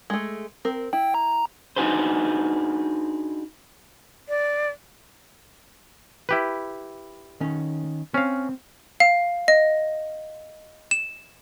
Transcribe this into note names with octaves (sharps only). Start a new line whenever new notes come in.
G#3 A3
C4 A#4
E4 G5
A#5
D4 D#4 F#4 G#4 B4 C5
D5
E4 G4 B4
D#3 C#4
C4 C#4 F5
F5
D#5
E7